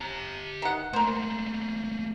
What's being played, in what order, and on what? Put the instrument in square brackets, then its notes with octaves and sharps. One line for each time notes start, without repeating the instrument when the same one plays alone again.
[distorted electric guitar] G4 A#5
[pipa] D#3 F#5
[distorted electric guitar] A3 A#3 [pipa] A#4 C5